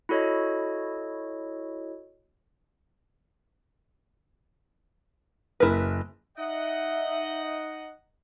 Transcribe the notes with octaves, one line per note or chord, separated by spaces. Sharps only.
E4 F#4 A4 C#5 D#5
F#1 E4 A#4 B4
D#4 D#5 E5 F#5